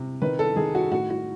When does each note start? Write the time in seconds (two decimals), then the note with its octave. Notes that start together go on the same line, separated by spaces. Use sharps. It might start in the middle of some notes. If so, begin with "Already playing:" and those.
Already playing: C3
0.22 D#3 B4
0.39 A4
0.56 D#3 G#4
0.75 F#4
0.91 A2 F#4
1.10 F#4